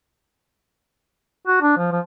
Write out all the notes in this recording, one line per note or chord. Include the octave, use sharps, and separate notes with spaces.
F#4
D4
F3
F3